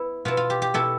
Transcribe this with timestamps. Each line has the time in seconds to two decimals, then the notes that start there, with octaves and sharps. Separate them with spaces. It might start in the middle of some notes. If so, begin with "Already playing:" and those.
Already playing: B3 E4
0.25 B2 B3 E4 F4
0.37 F4
0.50 G4
0.62 G4
0.74 B2 B3 E4 A4